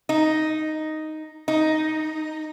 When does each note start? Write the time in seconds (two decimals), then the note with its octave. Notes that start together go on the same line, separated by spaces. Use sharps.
0.09 D#4
1.48 D#4